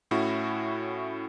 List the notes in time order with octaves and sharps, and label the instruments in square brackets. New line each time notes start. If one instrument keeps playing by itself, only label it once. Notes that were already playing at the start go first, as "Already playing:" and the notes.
[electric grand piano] A2 C#4 E4 F#4